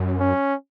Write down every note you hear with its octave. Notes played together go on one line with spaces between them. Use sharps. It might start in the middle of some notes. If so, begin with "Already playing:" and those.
Already playing: F#2
C#4